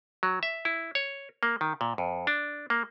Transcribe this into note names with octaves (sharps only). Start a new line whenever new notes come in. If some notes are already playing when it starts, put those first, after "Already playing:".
F#3
E5
E4
C#5
A#3
D#3
A#2
F2
D4
A#3